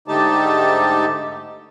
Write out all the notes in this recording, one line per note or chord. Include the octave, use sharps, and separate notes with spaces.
G#2 D3 A3 D#4 G4 A5